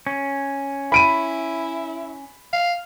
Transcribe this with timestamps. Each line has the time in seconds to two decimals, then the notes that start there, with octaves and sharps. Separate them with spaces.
0.07 C#4
0.92 E4 B5 D7 D#7
2.53 F5